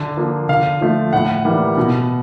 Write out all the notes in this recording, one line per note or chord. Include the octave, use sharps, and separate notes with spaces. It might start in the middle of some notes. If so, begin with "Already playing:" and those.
Already playing: D3
F3 A#3
D3 F5
F3 A3
A2 F#5
E3 G3 A#3
B2